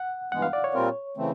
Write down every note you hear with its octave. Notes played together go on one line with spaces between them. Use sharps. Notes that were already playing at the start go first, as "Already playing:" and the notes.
Already playing: F#5
G2 E3 G#3 B3 F#5
F5
D5
C#5
A#2 G3 C4 F4 A#4
C#3 E3 A3 C4